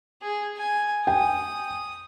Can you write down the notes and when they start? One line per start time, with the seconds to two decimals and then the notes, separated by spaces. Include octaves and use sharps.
0.22 G#4
0.57 G#5
1.07 G5 G#5 D#6